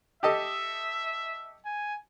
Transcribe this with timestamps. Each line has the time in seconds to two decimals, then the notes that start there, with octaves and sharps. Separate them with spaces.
0.23 G4 A4 D#5 E5
1.65 G#5